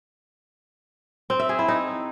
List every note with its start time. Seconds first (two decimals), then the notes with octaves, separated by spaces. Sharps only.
1.30 C4
1.39 E5
1.49 G#4
1.59 E4
1.68 D#4